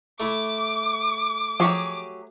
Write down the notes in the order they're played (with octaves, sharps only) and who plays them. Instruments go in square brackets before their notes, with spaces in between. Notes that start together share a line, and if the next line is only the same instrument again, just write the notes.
[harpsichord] A3 E4 [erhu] D6
[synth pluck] F3 C#6 [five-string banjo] F#3 G4 G#4